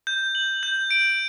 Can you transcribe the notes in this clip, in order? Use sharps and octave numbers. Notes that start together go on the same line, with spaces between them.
G6
F#7
G6
D7